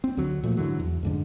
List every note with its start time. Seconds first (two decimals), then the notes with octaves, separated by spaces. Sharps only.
0.04 C4
0.17 D2 D3 F#3
0.44 A#2 F3 A3
0.57 G#2 D3 E3 F#3
0.80 E2
1.03 F2 G#2 D3